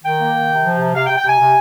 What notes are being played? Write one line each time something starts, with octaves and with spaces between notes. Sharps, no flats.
D#3 G5
A#3
D#3
C3
F3
C3
C3 F5
G5
C3
G5
C3 G#5
C3